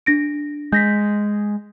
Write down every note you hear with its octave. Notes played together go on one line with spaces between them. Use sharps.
D4 A#6 D7
G#3 G6 A#6 B6